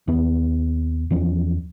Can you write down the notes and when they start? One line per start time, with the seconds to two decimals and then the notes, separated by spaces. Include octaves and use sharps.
0.08 D#2 B3
1.11 E2 F3 C#4